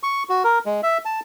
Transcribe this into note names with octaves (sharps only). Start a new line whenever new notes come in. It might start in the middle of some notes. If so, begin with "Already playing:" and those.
C#6
F#4
A#4
G#3
E5
A5